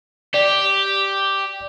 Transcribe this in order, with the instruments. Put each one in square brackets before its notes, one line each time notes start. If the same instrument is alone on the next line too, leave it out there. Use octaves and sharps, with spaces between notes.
[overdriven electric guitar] G4 [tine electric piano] D5